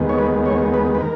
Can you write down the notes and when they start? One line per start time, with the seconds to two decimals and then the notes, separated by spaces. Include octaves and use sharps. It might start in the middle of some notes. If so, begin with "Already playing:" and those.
Already playing: D#2 D#3 G#3 B3
0.09 C#5
0.19 B4
0.46 C#5
0.74 B4
0.95 B4
1.01 A#4